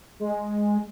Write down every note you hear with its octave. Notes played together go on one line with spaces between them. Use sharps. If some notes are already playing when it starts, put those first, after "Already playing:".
G#3